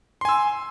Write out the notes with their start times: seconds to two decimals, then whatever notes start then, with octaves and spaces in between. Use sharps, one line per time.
0.21 C6
0.25 G#5
0.29 E6